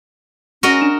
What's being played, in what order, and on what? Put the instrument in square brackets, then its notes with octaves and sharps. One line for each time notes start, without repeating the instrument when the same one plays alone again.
[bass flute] C#4 [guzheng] F#4 A#4 D#5
[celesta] D4 E7